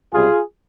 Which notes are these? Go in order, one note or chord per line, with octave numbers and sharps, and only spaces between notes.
C#2 C3 G3 F4 G#4